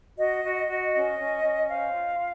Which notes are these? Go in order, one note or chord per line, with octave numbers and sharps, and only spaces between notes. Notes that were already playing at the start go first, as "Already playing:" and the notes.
F#4 D#5
F#4
F#4
C#4 D#5
C#4
C#4
C5 F5
F4
F4